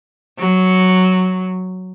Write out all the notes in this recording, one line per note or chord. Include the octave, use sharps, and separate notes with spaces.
F#3